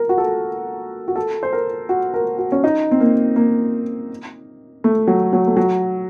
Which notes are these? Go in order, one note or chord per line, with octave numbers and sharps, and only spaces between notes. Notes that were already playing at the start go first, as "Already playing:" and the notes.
Already playing: A#4
F#4
A4
F#4
A4
C5
A#4
F#4
A#4
F#4
C#4
D#4
C4
A#3
A#3
A3
F#3
F#3
A3
F#3